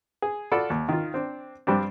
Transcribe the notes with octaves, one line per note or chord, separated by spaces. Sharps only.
G#4
F4 F#4 A4 D5 B5
D#2
D#3 F4
C4 D4
G2 G3 C4 D4